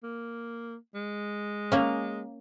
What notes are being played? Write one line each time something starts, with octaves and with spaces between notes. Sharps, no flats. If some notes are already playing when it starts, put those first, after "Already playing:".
A#3
G#3
A#3 C#4